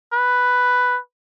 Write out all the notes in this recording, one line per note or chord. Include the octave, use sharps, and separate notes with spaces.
B4